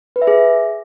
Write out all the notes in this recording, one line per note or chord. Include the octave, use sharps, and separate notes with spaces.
B4
E5
G#4